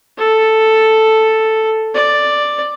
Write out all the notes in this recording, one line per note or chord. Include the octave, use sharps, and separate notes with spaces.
A4
D5